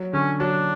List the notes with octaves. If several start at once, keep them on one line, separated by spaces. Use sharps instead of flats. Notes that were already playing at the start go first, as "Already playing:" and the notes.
Already playing: F#3
D3 C#4
F#3 D4